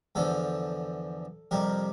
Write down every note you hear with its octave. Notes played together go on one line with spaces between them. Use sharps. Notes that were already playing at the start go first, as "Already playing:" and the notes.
E2 D3 F3 A4
F2 C3 G3 A#4